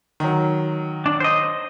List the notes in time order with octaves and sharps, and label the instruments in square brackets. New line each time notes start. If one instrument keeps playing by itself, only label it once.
[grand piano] D#3 F#3
[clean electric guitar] D4
C5 D#5